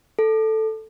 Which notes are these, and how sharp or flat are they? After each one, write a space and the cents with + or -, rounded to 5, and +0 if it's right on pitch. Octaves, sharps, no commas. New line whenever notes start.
A4 +0